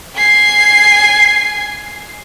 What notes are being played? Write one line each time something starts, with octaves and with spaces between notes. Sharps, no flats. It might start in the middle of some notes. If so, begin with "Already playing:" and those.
G#5 C7